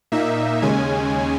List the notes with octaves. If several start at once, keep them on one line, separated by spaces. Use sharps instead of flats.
A#2 A#3 D#4 E5
D#2 C#3 G#3 C#4 G#5